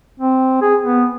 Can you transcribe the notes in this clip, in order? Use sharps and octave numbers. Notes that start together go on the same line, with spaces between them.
C4
G#4
B3